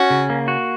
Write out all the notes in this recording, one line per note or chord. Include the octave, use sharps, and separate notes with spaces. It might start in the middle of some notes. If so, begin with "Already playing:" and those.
Already playing: C#4 F#4
C#3
A#3
F#4